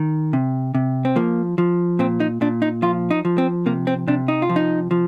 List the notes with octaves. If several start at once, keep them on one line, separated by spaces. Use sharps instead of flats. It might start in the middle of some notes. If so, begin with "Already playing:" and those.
Already playing: D#3
C3
C3
C4
F3 A#3
F3
A#2 C4
D#4
A#2 D4
D#4
F3 F4
D#4
F3
C4
C3 A#3
C4
C3 D4
D#4
F4
F3
D#4
F3